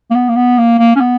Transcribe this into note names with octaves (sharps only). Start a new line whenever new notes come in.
A#3
B3
A#3
B3
A#3
A#3
C#4
B3